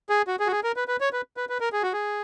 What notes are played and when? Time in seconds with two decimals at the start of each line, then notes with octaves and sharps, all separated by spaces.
0.09 G#4
0.27 F#4
0.40 G#4
0.47 F#4
0.52 G#4
0.64 A#4
0.76 B4
0.88 B4
1.01 C#5
1.13 B4
1.37 B4
1.49 B4
1.60 A#4
1.73 G#4
1.83 F#4
1.93 G#4